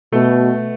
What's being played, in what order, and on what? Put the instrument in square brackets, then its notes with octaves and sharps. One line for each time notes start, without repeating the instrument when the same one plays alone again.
[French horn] B2 [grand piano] A3